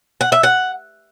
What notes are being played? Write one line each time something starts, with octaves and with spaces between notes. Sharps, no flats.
F#5
E5
F#5